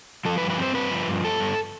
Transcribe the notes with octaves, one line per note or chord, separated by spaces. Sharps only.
F3 A4
B4
G2
B4
C4 C5
G2 B4
F3
G2
G2 A4
G2